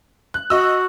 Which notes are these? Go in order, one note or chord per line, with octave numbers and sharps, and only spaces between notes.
F#6
F#4 D#5 E6